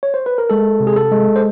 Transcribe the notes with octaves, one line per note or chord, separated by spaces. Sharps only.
C#5
C5
B4
A#4
G#3 A4
C3
G#4
A4
G#3
C5